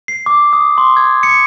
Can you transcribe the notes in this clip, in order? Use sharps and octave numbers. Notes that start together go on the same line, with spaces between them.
C7
D6
D#6
C6
G#6
C#7